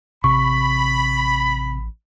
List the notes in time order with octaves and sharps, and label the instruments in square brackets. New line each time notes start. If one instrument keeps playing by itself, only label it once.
[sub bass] A1 [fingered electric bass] C3 [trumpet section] B5 [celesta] C#6